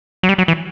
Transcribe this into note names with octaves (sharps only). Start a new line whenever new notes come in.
F#3
G3
F#3
E3